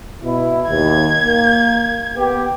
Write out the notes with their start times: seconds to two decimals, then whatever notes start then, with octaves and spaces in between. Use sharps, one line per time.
0.24 B2 E4
0.69 D#2 G#6
1.25 A#3
2.16 B3 G4